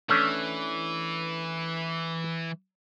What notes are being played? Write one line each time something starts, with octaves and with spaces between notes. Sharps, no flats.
E3 A3 C#4 D4